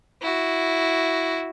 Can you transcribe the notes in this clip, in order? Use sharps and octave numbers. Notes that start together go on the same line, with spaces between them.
E4 F#4